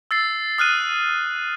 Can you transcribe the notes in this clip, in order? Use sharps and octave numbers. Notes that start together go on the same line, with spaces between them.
E6 A6 C7
D#6 F6 F#6 D#7